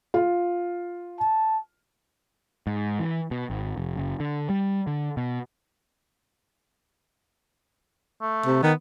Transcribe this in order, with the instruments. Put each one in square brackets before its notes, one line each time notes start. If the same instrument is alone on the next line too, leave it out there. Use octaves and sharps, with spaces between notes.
[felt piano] F4
[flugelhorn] A5
[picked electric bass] G#2
E3
B2
G#1
F1
F#1
D3
G3
D3
B2
[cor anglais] A3
[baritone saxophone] C3
[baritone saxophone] D#3 [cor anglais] B3